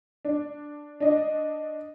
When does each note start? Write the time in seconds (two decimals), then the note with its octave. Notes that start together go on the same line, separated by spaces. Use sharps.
0.25 D4
1.00 D4 D#5